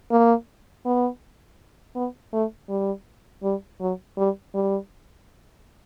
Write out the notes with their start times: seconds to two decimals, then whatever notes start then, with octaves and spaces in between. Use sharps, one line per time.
0.11 A#3
0.85 B3
1.95 B3
2.33 A3
2.69 G3
3.43 G3
3.80 F#3
4.17 G3
4.54 G3